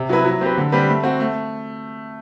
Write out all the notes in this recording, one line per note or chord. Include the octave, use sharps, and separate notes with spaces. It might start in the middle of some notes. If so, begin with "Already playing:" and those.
Already playing: C3
F#3 B3 E4 B4
F#3
C4 G4 B4
D3
G3 C4 G4 B4
A3
C4 F#4
A3